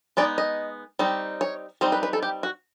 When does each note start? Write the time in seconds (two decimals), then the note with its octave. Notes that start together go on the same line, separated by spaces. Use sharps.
0.17 G#3 B3 D#4 D5
0.38 D#5
0.99 G3 C4 D#4
1.41 C#5
1.81 G3 C4 D#4 C5
1.92 B4
2.03 B4
2.13 A4
2.23 G4
2.43 F#4